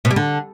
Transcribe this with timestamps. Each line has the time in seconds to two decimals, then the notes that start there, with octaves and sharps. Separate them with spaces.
0.05 B2
0.11 G3
0.16 D3